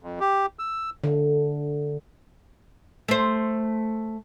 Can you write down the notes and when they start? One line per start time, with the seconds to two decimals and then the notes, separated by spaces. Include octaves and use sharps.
0.03 F2
0.20 G4
0.59 E6
1.04 D3
3.08 A3 C5